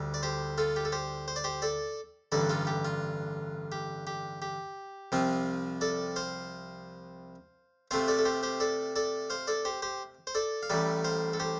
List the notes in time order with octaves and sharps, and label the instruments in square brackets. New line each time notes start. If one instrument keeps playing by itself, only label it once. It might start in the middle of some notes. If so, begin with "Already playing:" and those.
Already playing: [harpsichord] D2 D3 G3
D5
G4 C5
F4 A4
G4
A4
G4 C5
C5
D5
G4 C5
A4 D5
A1 G2 D3 A4 D5
F4 A4
G4
F4
G4
G4
G4
C2 C3 F3 C4 F4
A4 D5
C5 F5
C3 A3 C4 F4 C5 F5
A4 D5
A4
G4 C5
G4 C5
A4 D5
A4 D5
C5 F5
A4 D5
G4 C5
G4 C5
C5
A4 D5
F5
A1 A2 G3 A4 D5
C5 F5
A4
G4 C5